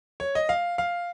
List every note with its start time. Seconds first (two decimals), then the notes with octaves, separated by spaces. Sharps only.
0.20 C#5
0.35 D#5
0.49 F5
0.78 F5